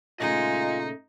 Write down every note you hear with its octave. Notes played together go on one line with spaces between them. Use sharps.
A#2 C#3 A3 D#4 F4 D#5 G#5